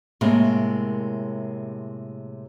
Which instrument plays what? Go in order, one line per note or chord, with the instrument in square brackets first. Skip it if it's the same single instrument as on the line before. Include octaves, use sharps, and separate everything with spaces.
[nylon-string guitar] A2 C3 G#3 A#3